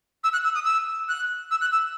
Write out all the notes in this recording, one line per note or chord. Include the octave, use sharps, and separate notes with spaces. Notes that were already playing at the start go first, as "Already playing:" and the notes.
E6
F#6
E6
D#6
E6
F#6
E6
F#6
E6